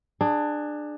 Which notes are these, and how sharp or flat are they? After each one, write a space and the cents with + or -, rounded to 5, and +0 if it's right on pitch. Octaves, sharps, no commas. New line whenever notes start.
D4 +20 G#4 +0